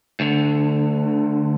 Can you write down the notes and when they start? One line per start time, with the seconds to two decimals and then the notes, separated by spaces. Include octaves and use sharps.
0.20 D2 D3